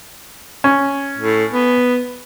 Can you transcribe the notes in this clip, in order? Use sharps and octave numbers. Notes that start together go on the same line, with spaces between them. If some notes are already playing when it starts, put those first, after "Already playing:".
C#4
A2
B3